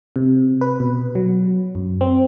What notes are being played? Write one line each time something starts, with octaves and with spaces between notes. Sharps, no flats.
C3
B4
B2
F#3
F#2
C4